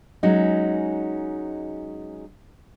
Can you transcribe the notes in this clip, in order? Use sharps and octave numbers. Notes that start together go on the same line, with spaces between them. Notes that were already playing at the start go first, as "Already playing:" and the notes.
F#3 G#3 C#4 D#4